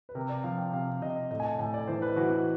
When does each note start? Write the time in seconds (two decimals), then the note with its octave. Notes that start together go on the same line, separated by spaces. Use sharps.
0.09 B4
0.15 C3 A#4
0.29 D5
0.44 F3 F5
0.58 G5
0.73 C3 F5
1.02 C3 D#5
1.31 A2 D#5
1.40 G#5
1.45 A5
1.59 A2 G#5
1.74 D5
1.87 E3 C5
2.02 B4
2.16 E3 F#4
2.31 F#4